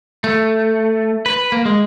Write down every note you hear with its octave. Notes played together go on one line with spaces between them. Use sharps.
A3
B4
A#3
G#3